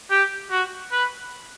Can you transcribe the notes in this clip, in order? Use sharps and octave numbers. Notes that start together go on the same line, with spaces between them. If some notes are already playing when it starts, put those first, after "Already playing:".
G4
F#4
B4